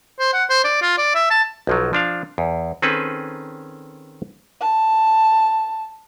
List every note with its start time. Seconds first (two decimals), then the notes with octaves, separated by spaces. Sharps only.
0.19 C5
0.33 F#5
0.50 C5
0.65 D5
0.82 F4
0.98 D5
1.15 E5
1.31 A5
1.67 B1 F3 F#3
1.93 F3 D4 F5
2.38 E2
2.82 D#3 C4 C#4 G#4 A4 B4
4.61 A5